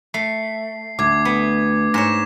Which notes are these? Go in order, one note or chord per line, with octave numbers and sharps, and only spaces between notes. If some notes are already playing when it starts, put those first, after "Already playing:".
A3 C7
D2 D6 G#6
B3
G#2 C#5 A#6 E7